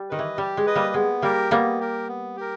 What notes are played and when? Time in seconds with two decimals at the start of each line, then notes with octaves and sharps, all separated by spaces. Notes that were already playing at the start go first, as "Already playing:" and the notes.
Already playing: G3
0.10 D#3 B4 D#5
0.19 E3
0.38 G3 G4
0.57 G#3
0.66 B4 D#5
0.75 G3 A#3
0.94 G#3 B3
1.22 G3 A#3 G4 A#4
1.51 G3 A#3 B3
1.80 G4 A#4
2.08 B3
2.36 G4 A#4